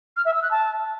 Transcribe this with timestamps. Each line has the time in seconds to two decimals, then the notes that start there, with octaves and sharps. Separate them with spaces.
0.17 F6
0.25 E5
0.34 E6
0.42 F#6
0.51 A5